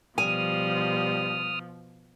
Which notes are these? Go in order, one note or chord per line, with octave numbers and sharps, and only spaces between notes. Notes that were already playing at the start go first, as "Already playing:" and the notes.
B2 F3 G3 G#5 D#6 F6